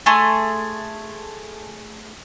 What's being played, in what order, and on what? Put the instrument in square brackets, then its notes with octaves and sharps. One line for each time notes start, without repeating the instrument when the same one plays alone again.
[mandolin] A3 G#4 C6